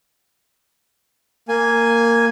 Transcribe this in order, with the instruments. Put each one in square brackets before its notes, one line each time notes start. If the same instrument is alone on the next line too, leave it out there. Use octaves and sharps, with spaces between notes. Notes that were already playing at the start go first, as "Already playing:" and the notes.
[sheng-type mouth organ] A#3 G#5